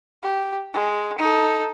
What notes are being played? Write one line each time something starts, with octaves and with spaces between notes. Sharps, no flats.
G4
G#3
D#4 A4